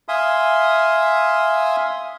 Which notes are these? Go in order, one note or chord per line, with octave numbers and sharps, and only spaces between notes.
E5 F5 G#5 C6 D#6